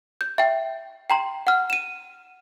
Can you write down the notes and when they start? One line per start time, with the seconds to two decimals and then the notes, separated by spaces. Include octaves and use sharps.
0.21 G6
0.38 E5 G5
1.10 G5 A#5 C6
1.47 F#5 F6
1.70 D#7 E7